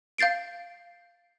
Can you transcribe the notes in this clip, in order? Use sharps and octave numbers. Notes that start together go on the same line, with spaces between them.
F5 G6 A6 C7 D7